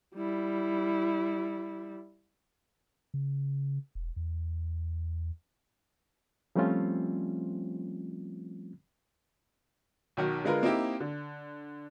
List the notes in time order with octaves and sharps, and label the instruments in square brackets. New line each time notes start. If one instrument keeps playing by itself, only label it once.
[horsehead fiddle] G3 E4
[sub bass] C#3
E1
E2
[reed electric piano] F3 G3 A3 C4 C#4 F4
[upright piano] B1 D#3 F#4
D3 G#3 F4 A#4 B4
A#3 C4 D#4 E4 G4
D3